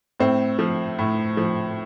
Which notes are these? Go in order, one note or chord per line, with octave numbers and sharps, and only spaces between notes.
A2 C4
F3
A2
F3